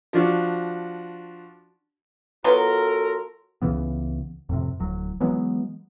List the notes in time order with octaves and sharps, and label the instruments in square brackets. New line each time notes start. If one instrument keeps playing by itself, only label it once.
[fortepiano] F3 D4 F#4
[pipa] F#3 B3 F4 [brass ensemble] F#4 A4 A#4
[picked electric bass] C#2 C#3 E3 B3
F2 A2 C3
D1 F#3
E3 F#3 G#3 B3